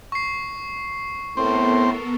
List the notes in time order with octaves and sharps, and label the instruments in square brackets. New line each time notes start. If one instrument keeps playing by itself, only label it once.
[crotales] C#6 C7
[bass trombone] A2 [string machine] B3 A4 A#4 [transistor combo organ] C4